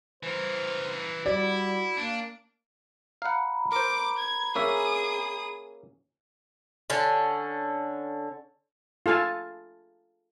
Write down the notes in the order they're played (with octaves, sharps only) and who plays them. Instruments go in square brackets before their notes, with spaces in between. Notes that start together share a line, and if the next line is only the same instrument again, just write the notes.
[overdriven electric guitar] E3 A#4 [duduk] C5
[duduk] G3 [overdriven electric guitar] E4 [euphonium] F#4 [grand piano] D5
[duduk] A#3 [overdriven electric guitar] D4
[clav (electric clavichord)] F5 F#5 [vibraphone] A#5 B5
[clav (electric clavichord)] A#4 C5 [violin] D6
[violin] G#6
[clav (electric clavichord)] A#3 C#4 E5 [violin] G#4 D#6
[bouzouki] D3 C#4
[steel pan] F4 A4 F5 G#5 A5